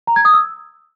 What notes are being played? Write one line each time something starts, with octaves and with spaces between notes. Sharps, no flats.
A#5
G#6
D#6
E6